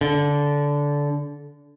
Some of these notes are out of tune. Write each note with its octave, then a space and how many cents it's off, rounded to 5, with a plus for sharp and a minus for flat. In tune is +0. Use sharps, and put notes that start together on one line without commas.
D3 -20